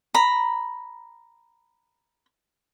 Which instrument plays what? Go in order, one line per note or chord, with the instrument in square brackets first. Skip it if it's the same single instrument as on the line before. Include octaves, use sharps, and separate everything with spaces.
[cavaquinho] A#5 B5